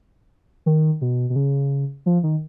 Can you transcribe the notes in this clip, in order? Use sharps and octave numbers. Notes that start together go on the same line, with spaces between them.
D#3
B2
B2
C#3
F3
D#3